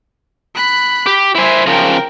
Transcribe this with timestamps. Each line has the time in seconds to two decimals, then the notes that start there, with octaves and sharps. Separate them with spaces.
0.55 B5 F#6
1.06 G4
1.35 E4 C5 E5 G#5
1.66 C#3 F3 A#4 G5